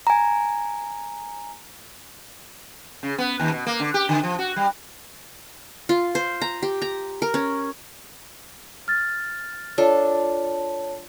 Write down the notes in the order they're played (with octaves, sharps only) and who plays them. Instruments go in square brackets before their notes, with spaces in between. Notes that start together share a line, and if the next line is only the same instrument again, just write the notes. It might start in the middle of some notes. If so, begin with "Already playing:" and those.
[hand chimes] G#5 A#5
[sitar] C#3
B3
D#2
B2
A#3
D3
G4
D3
F3
F#4
G3
[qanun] F4
C5
A#5
G4
A#5
A#4
C#4
[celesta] F6 A6
[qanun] D4 F4 A4 [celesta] C#5 A5